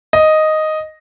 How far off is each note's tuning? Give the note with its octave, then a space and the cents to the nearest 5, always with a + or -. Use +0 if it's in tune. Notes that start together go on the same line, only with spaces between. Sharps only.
D#5 +0